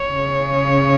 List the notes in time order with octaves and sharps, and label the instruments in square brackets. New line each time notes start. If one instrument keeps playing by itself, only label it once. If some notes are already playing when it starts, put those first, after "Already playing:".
Already playing: [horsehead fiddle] C#5
[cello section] C#3